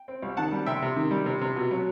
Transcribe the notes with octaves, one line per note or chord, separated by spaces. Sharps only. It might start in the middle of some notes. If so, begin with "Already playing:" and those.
Already playing: G5
C4
C2
D#3 F#5 A5
G3
C3 E5 G5
C3
D#3
G3
C3
C3
B2
F#3